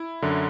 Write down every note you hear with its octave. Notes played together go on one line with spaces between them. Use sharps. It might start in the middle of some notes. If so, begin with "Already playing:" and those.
Already playing: E4
F#2 D3